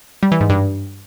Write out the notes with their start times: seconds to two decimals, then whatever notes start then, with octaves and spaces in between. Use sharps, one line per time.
0.23 G3
0.32 E3
0.41 G#2
0.50 G2